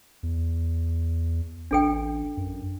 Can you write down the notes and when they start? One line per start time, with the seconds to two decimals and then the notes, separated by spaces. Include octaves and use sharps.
0.23 E2
1.71 A1 D4 A4 G5
2.37 F#2